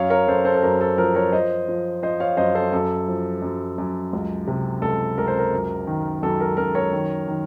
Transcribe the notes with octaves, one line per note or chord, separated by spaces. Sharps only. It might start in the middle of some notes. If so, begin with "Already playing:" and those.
Already playing: F#2 C#5 F5
A#4 C#5
F#2 A4 C5
A4 C5
A4
F#2 A#4
A4
F3 A#4
A#4 C#5
F3 C5 D#5
F3
F3 C5 D#5
C#5 F5
F#2 C5 D#5
A4 C5
F#2 A4
F3
F#2
F#2
C#2
C3
C#2 A4
C#2 A#4
C5
A#4
F#2
D#3
F#2 A4
A#4
F#2 A#4
A#4 C#5
D#3
D#3